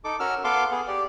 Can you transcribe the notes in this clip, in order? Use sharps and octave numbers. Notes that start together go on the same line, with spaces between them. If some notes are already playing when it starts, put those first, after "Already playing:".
D#4 A4 D6
C#4 F#4 A#4 E6 F6
B3 A4 F5 C6 D6
B3 G#4
G4 D5